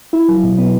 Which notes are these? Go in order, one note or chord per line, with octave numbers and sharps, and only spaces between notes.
E4
F#3
B2
B3